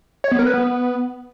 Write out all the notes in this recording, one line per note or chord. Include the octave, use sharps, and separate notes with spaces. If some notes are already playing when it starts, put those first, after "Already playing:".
C#5
B3
A#4
B4
B3